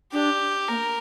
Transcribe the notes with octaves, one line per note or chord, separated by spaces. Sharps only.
D4 G4
A#3 A#4